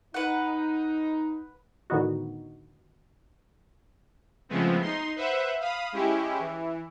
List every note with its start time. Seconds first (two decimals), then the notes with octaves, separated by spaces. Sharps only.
0.14 D#4 B4 F#5
1.90 A2 D3 D#3 B3 D#4 F#4
4.49 C#3 F3 G#3 A3 B3 C4
4.81 D#4 C6
5.16 B4 C5 E5 F#5
5.60 F5 B5 D#6
5.92 G#3 C#4 E4 G4
6.39 E3